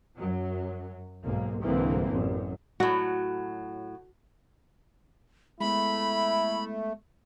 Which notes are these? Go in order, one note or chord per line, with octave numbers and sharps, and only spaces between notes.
F#2 F#3
B1 G#2 A#3
C2 G#2 D3 E3 A#3 C4
A1 F#2
A2 F#3 F#4
G#3 A3 B3 E4 B5